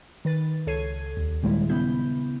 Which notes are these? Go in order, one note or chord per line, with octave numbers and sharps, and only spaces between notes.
D#3 B4 A6
C#2 A4 C#5 G#6 C7 D#7
D#2
A#2 D#3 G3 G#3 E4
C#3 B3 E4 B5 G6